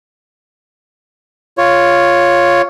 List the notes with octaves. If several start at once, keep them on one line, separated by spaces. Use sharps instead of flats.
F4 C#5